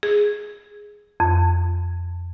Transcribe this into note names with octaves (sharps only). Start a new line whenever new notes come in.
G#4
F2